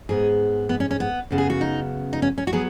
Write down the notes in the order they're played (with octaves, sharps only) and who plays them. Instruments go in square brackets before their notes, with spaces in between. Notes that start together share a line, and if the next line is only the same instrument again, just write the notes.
[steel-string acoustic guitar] G#2 G#3 B3 G#4
B3
C#4
C#4
B3
F#2 C#3 B3
G#4
F#4
D#4
D#4
C#4
C#4
F#4
F#3 B3 G#4